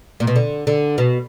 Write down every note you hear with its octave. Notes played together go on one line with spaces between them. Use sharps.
A#2
B2
D3
D3
B2